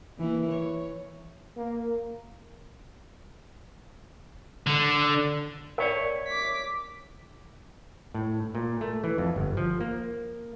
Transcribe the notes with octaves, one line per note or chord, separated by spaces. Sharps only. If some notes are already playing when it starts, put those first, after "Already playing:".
E3 A#3
C#5
A#3
D3
A#4 C#5 D5 E5
D6 B6
A2
A#2
A3
E3
F2
G1
F3
A#3